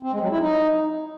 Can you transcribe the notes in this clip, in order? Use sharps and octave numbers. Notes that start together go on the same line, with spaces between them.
C4
G#3
F#3
E4
D#4